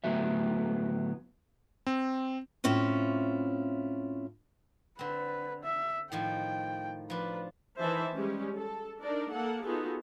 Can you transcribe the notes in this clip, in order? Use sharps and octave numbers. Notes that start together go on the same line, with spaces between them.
D2 A2 F#3 B3 E5
C4
A2 C4 C#4 E4 F4
D3 C4 B4
E5
A2 D#3 F3 G5
F3 D4 B4
D#3 E3 C5 E5 A5
G3 G#3 C#4 G4
A4
D4 D#4 A#4 D5
A#3 A4 F#5
B3 D#4 F4 F#4 G#4 A4